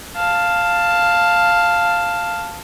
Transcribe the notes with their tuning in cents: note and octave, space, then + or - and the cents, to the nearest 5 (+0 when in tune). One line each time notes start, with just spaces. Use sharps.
F5 +0 A5 +5